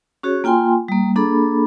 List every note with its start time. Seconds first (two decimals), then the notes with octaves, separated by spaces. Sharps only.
0.23 C#4 F#4 G#4 C#5
0.44 A#3 F4 G5 G#5 C6
0.88 G3 A#3
1.16 A#3 D4 G#4 A4 B5